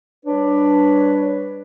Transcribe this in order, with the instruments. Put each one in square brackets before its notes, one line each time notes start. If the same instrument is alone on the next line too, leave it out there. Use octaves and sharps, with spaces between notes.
[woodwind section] G3 D4 B4 C#5